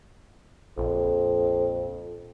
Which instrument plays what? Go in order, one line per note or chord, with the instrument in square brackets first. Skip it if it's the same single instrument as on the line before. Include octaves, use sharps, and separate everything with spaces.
[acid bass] A#1 [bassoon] F2